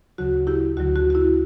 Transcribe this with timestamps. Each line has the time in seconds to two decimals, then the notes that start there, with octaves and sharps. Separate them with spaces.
0.18 D2 C#3 F#3 F#4
0.47 E4 G4
0.77 D2 D3 F#3 F#4
0.96 F#4
1.10 F#4
1.15 E4